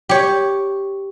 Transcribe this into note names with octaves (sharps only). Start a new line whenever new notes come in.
G4 C#5